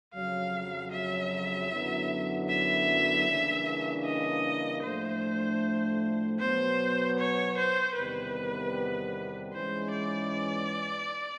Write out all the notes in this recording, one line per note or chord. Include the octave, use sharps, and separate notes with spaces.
F2 C#3 F#3 F5
E5
F#2 D3 F#3 B3 E4
E5
C#3 E3 G3 A#3 D4
D#5
A2 F3 A3 D4 C5
B2 F#3 B3 C5
C#5
C5
E2 C3 D#3 G3 B3 B4
G#2 E3 G#3 C#4 C5
D5